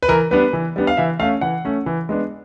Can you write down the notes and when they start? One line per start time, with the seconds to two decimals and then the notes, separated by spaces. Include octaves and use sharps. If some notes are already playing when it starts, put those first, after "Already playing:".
0.03 B4
0.08 E3 A#4
0.31 G3 B3 D4 B4
0.53 E3
0.76 G3 B3 D4
0.87 F5
0.97 E3 E5
1.19 A3 F5
1.23 C#4
1.41 E3 F#5
1.65 A3 C#4
1.86 E3
2.09 G#3 B3 D4